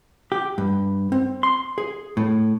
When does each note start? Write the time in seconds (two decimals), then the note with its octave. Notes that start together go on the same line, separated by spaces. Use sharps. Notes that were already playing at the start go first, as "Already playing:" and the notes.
0.32 G4
0.58 G2
1.12 C4
1.43 C6
1.78 G#4
2.17 A2